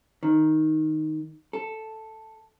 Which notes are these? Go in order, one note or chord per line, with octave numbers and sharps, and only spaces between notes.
D#3
A4